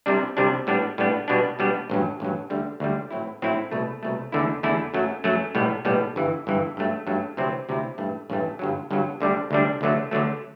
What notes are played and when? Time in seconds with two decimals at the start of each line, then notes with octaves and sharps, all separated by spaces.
0.06 C2 C3 G3 D4
0.37 C2 C3 G3 D4
0.67 A2 G3 B3 D4
0.98 A2 G3 B3 D4
1.28 B2 G3 B3 D4
1.59 B2 G3 B3 D4
1.90 A1 G2 F#3
2.20 A1 G2 F#3
2.50 D2 D3 G3
2.80 D2 D3 G3
3.11 A2 F#3 C4 E4
3.42 A2 F#3 C4 E4
3.71 C2 B2 A3
4.03 C2 B2 A3
4.32 E2 D3 A3 E4
4.63 E2 D3 A3 E4
4.94 F#2 F#3 A3
5.24 F#2 F#3 A3
5.55 B1 A2 G3 B3
5.85 B1 A2 G3 B3
6.16 G1 G2 E3
6.47 G1 G2 E3
6.77 G2 F#3 A3
7.07 G2 F#3 A3
7.37 D2 C3 F#3 C4 E4
7.69 D2 C3 F#3 C4 E4
7.98 A1 G2 E3 A3
8.30 A1 G2 E3 A3
8.59 G1 G2 F#3
8.91 G1 G2 F#3
9.20 D2 D3 G3 D4
9.51 D2 D3 G3 D4
9.81 D2 D3 F#3 A3
10.11 D2 D3 F#3 A3